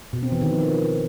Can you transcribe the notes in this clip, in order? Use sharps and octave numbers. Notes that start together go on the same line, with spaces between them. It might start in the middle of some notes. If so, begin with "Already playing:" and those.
B2
C4
E3
D#3
F3